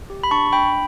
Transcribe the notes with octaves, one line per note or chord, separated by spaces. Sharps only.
G4
B5
D4 A5 C#6
D4 G5 B5